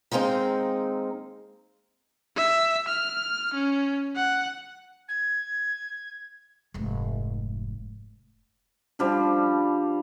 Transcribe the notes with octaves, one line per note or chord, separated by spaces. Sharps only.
D#3 G#3 A#3 C4 D#4
E5
F6
C#4
F#5
G#6
F1 G#2
F3 G3 D4